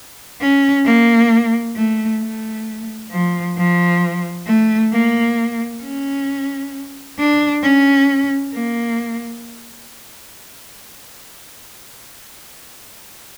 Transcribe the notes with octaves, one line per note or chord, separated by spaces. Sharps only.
C#4
A#3
A3
A3
F3
F3
A3
A#3
C#4
D4
C#4
A#3